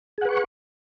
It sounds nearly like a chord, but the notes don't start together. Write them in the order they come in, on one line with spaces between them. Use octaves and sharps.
G#4 F#5 B4 C#6